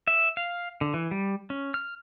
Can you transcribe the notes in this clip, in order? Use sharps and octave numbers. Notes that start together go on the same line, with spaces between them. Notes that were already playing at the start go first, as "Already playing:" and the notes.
E5
F5
D3
E3
G3
C#4
F6